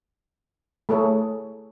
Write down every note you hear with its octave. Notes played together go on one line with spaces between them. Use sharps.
A3 G#4 A4 C#5